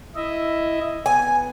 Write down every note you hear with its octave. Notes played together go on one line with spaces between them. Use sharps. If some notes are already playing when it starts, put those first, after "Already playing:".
E4 D#5 E5
B3 G#5